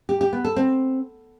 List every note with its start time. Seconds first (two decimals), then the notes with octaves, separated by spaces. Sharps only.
0.09 G4
0.21 G4
0.33 B3
0.45 A4
0.56 C4